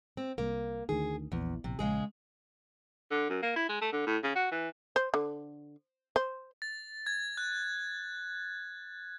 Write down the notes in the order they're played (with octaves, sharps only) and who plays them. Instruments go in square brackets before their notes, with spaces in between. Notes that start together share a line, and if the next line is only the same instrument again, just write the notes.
[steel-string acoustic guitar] C4
[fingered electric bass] C2 [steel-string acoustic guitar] A#3
[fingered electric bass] D2 D#3 [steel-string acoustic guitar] G#4
[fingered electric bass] A#1 [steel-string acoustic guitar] E2
[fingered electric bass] A#1 [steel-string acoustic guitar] C3
[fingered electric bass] A#1 [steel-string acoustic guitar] C#3 G#3 G#4
[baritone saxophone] D3
F#2
A#3
E4
G#3
A3
D3
A2
C#3
F#4
E3
[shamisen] C5
D3
C5
[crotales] A6
G#6
F#6